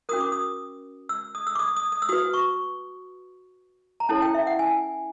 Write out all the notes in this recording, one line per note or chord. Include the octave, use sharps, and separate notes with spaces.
C#4 F#4 A#4 D#6
D6
D#6
E6
D#6
E6
D6
D#6
D#6
D#6
E6
F#4 B4 D#6
C#6
A#5
C#4 E4 A4 C#5 A5
G5
E5
F#5
G#5